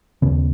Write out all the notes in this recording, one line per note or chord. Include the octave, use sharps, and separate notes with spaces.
D#2 C#3 B3